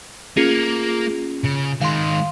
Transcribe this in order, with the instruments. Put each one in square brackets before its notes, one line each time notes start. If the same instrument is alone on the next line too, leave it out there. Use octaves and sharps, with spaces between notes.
[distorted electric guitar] A#3 [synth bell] C#4 F4 G#4
[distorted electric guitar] C#3
[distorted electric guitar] D#3 G#3 [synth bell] F5 C6